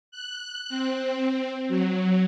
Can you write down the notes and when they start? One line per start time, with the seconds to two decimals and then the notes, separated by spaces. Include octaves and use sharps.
0.11 F#6
0.69 C4
1.68 F#3